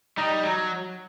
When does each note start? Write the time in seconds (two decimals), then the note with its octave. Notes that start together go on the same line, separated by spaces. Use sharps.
0.17 G3 D#4
0.44 F#3